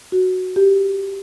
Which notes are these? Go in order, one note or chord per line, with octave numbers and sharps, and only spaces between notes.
F#4
G4